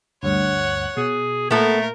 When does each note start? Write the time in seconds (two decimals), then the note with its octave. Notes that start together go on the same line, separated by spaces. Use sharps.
0.23 D2 G2 C#5 F#5
0.97 B2 G#4
1.51 A#2 A3 B3 F4 A4 A#4 F6